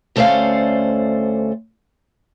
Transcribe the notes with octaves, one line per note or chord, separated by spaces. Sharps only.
D2 A3 C#4 C5 D5 F5